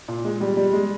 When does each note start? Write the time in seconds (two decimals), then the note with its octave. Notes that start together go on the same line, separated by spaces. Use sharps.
0.08 A#2
0.24 G#3
0.41 G3
0.57 G3
0.73 G#3